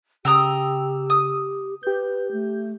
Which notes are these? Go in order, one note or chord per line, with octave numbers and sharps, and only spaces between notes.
C#3 G4 G5 A#5 D#6 E6
D#6
G4 B4 G6
A3